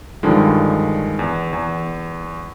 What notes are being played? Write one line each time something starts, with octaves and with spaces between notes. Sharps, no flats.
G2 D3 D#3 F3 G#3
E2
E2